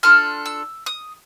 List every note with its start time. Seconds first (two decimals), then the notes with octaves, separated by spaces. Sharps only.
0.03 D4 F4 A4 F6
0.46 E6
0.86 D#6